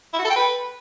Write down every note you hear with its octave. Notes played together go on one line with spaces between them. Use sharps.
E4
F#4
A4
G5
B4